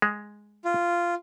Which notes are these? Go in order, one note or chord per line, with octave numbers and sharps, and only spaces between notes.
G#3
F4